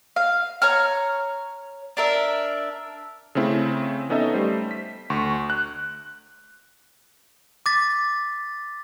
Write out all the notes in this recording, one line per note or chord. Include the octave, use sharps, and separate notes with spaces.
F5
C#5 A#5 F6
D4 A#4 E5
C#3 A3 C4 E4
B3 C#4 D#4 A4 D#5 E5
G3 A3 C5
B6
D2 C6 C#6
F#6
D6 A6 B6